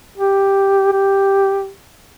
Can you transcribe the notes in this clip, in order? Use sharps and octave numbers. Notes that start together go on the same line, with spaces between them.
G4
G4